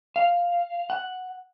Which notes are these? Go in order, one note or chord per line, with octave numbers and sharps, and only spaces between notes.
F5
F#5